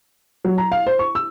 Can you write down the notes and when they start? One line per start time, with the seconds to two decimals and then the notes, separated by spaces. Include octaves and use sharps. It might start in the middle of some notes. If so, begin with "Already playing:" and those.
0.45 F#3
0.58 A#5
0.72 F5
0.87 C5
0.99 C#6
1.15 E6